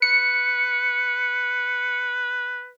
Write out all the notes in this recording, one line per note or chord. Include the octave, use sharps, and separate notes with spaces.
B4 C#7